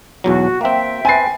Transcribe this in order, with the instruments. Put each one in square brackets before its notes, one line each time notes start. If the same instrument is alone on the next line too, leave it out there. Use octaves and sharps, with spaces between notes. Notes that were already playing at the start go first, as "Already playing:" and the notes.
[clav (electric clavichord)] B1 E2 F#3 [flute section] F#4
[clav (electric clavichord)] A#3 C4 [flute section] E5 G5
[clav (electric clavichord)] C4 B4 [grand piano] G#5 A6 C7